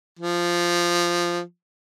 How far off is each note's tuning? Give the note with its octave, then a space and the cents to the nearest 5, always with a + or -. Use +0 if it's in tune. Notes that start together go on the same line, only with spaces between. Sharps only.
F3 -5